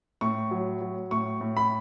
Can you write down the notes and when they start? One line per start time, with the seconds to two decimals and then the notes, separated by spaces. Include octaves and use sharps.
0.21 A2 C#6
0.51 F#3
0.81 F#3
1.11 A2 C#6
1.41 A2
1.57 B5